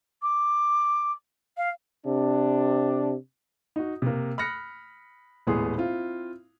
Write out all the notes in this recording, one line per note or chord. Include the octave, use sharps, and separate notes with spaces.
D6
F5
C3 D4
D#4 F#4
C3 A#3
B5 F6 F#6 A#6 C#7
D#1 A2 G#3 B3 G#4 C6
C4 E4 F4